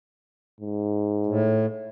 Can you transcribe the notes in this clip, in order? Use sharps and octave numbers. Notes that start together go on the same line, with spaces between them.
G#2
A2